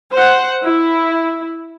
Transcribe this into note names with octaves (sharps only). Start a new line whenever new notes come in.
C5 F#5
E4